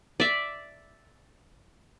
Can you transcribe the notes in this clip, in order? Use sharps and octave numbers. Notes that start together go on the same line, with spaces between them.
D5 E5